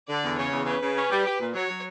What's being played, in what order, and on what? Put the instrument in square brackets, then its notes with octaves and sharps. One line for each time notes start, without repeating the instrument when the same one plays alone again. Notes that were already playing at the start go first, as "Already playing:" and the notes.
[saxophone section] D3 [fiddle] D5
[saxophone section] E2
[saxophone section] C#3 [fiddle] C#5
[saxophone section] E2
[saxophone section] C#3 [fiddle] B4
[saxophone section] C#3
C#4
G3
G4
A#2
[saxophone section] F#3 [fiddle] C#5
[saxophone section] F#3